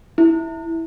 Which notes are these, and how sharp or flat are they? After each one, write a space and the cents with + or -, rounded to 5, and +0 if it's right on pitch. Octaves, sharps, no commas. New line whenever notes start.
E4 -10